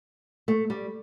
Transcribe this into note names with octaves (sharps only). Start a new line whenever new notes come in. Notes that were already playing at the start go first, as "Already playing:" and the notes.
A3
G3